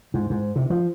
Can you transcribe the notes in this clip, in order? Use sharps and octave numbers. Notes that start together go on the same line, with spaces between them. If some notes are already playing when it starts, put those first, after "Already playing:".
G#2
G#2
C3
F3